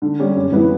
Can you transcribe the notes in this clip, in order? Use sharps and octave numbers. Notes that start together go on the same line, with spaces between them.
D3
G3 C#4 G4
F#2
E3 B3 E4